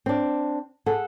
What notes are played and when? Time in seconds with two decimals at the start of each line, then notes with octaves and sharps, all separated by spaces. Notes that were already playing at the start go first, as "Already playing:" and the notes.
0.06 C4 D4
0.86 G#4 A4 F#5